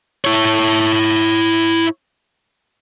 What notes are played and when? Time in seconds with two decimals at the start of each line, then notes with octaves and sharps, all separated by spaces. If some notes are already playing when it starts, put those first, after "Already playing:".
0.25 E4 C#5